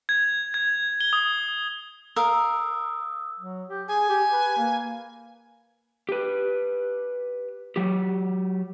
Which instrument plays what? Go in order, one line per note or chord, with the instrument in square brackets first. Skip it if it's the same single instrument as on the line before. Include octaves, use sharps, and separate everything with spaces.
[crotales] G#6
G#6
G7
D#6
[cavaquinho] A#4 F5 [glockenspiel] D#6 E6
[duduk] F#3
G4
[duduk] G#4 [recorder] G#5
[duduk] G4
B4
A#3
[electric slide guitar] G4 B4
F#3 F#4 G4